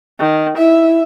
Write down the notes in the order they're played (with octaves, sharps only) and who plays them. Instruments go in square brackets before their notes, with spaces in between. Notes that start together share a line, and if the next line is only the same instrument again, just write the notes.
[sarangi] D#3
[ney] E4 [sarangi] E5